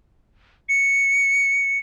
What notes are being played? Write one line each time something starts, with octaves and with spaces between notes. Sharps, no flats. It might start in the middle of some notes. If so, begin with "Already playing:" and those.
C#7